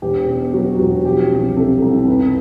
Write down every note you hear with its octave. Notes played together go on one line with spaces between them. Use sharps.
E1 G4
B2
F#3 F#4
E1 F#4
F3 G4
C2
C3 A4
C2
F1 B4